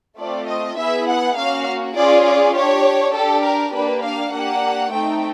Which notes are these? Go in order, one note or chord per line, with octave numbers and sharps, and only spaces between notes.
A3 C4 F4 D5
D#5
B3 E4 G#4 E5
F#5
A#3 C#4 F#4 F5
C#4 F4 G#4 D5
D5
D4 G4 C#5
D4 G4 A4
A#4
A#3 D4 G4 B4
F5
A#3 D4 G4 F#5
A3 C4 D#4 G5